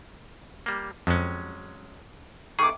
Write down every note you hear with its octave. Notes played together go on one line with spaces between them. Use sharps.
G3 A#3
F2 F#3 G#3 C#4
D#3 G#4 C#6 D6